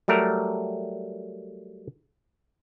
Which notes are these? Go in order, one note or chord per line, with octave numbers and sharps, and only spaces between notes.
F#3 G3 A3 A#4